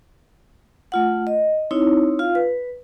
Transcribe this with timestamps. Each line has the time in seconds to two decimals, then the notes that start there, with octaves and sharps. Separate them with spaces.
0.92 A3 F4 F#5
1.27 D#5
1.71 C4 D#4 E4 C#5
2.19 F4 F5
2.35 B4